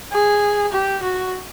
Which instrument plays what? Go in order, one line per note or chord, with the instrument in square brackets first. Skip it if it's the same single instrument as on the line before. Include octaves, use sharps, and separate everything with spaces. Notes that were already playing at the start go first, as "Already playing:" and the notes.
[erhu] G#4
G4
F#4